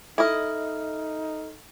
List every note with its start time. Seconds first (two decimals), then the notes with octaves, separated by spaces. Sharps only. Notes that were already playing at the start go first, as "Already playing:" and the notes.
0.18 D#4 E4 A4 D#5 F6